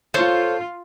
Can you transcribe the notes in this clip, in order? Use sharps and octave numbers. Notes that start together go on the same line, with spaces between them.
F4 A4 C5 C#5